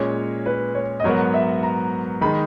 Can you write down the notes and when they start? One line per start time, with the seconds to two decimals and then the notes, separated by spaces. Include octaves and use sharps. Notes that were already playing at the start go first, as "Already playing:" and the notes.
Already playing: A#2 G#3 C#4 C#5
0.46 B4
0.75 C#5
1.00 D#5
1.04 G#2 F#3 B3 F#4 A#4 C#5
1.34 E5
1.63 A#5
2.21 D#3 G#3 D#4 B5